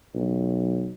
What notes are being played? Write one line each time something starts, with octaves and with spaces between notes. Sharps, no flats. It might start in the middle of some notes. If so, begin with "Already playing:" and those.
B1